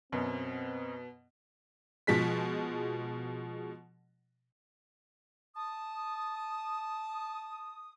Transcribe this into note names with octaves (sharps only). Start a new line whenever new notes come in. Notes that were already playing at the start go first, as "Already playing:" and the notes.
F#2 B2 C4
B2 F3 G#3 B6
A5 D#6